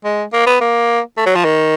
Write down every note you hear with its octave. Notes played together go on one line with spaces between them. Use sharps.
G#3
A#3
B3
A#3
A3
F#3
F3
D#3